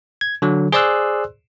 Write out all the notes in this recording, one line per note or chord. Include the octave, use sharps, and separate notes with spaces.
G#6
D3 F#3
G#4 C5 D5 C6 E6 F#6